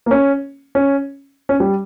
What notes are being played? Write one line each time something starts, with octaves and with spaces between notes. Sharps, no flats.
A#3
C#4
C#4
C#4
G3